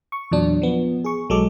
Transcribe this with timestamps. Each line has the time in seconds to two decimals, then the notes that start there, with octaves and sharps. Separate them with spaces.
0.12 C#6
0.31 E2 A#2 F#3 D4
0.62 F3 B3
1.04 G#4 C#6
1.29 B1 F#3 G#3 A4 D6